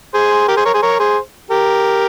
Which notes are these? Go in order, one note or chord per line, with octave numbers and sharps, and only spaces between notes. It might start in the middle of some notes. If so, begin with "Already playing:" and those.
G#4 C5
G4 A#4
G#4 C5
A#4 C#5
G#4 C5
A#4 C#5
G#4 C5
G4 A#4